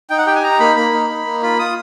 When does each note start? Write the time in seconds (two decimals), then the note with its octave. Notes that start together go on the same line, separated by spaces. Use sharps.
0.10 D#4 G5
0.18 F#5
0.27 G4 G5
0.35 G#5
0.43 D#4 A#5
0.60 A#3 B5
0.76 A#3 B5
0.93 D#4
1.10 D#4
1.26 A#3
1.42 F4 B5
1.59 F4 D#6